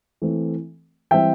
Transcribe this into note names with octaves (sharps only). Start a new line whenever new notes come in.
E3 A3 C4
E3 G3 C4 E5 G5